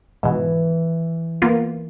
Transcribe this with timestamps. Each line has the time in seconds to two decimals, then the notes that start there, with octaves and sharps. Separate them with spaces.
0.23 G#2 B2 E3
1.42 A#3 B3 F4